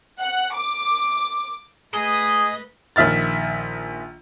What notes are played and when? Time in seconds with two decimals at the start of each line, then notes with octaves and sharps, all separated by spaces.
0.21 F#5
0.55 D6
1.94 A3 G#4 B4 D#5
2.96 A#1 D#3 E5 F6 A6